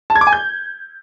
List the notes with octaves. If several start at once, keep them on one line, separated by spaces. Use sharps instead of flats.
A5
G#6
D6
G#5
G6